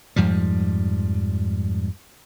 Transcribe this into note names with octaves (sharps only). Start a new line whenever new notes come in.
F2 G#2 F3 G3